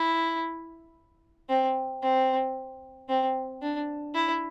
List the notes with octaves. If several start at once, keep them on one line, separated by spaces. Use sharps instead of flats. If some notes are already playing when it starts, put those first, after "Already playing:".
Already playing: E4
C4
C4
C4
D4
E4